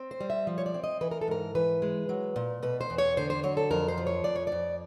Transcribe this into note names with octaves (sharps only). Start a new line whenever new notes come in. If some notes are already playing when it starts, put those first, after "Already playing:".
Already playing: C4
C5
G3
E5
F3
C#5
D5
C4
D#5
E3 B4
A#4
A4
G#2 A#4
E3 B4
G#3
F#3
A#2
B2 B4
C5
E2
C#5
D3 C5
C5
F#3 C#5
A4
F2 A#4
C5
F3
C#5
F2 D5
C#5
F2 D5